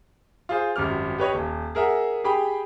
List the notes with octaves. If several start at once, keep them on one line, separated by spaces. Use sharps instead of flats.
F4 G#4 C5
G#1 F#2 G3 D6 F6
G4 B4 C#5 D#5
D#1
G#4 A#4 E5 F#5
G4 G#4 G5 B5